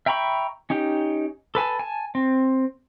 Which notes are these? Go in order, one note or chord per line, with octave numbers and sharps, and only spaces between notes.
E5 G5 A#5 B5 C#6
C#4 D#4 G4
A4 B4 G#5 A5
G#5 A5
C4